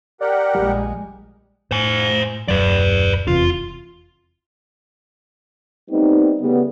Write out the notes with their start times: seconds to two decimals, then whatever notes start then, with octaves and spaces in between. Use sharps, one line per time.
0.21 G4 A#4 D5 F#5
0.55 A#1 G3 G#3
1.71 A2 C5 G#5
2.48 D#1 F#2 F#3 B4 D5
3.27 F1 E2 C3 F4
5.91 G3 A3 B3 C4 D#4
6.41 C#3 G3 A3 B3